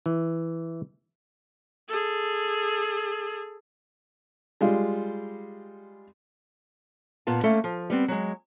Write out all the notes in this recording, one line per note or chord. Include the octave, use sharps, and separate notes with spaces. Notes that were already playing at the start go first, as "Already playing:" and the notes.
E3
G#4 A4
G3 G#3 F4
A#2 B3 F4 A5
A3 A#3 C#4 A4
F3
G3 B3 C4
F#3 G#3